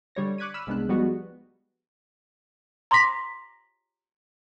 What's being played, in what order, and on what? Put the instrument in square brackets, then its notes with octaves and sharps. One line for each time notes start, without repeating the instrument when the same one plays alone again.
[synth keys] D3 G3 C#5 A#6
C#6 D6 F#6 G#6 B6 D#7
B5 E6 F6 B6 D#7
C2 G#3 B3 D4 F#6
F3 G3 G#3 B3 D#4 F#4
[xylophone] A#5 C6 D6 A#6 B6